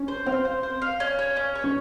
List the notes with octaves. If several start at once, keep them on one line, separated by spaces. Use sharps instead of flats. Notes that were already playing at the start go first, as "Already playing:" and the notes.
Already playing: C#4
C5
C4 F5
C5
C5
F5
C#4
C#5
C#4
C#5
C#4